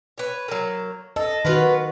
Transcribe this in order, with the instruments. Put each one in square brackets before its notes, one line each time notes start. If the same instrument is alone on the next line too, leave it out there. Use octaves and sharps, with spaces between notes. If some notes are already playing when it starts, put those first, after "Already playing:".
[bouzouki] B4 C#5
F#3 A#3
[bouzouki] A4 [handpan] D#5
[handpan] D#3 F#4 [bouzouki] B3 F4 B4